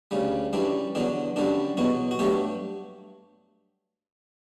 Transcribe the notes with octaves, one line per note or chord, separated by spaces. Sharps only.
D2 C#3 G3
F#2 E3 G3 D4
E2 D3 F#3 D4
F#2 D3 G3 D4
E2 B2 F#3 F#4
F#4
G2 F#3 A3 G4